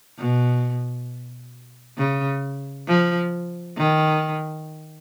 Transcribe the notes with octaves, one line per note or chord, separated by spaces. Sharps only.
B2
C#3
F3
D#3